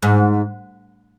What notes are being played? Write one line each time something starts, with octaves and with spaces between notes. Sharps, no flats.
G#2